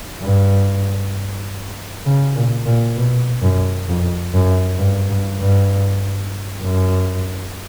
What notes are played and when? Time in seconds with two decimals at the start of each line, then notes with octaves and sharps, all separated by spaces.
0.22 G2
2.06 C#3
2.35 A#2
2.66 A#2
2.96 B2
3.42 F#2
3.88 F2
4.34 F#2
4.79 G2
5.09 G2
5.41 G2
6.62 F#2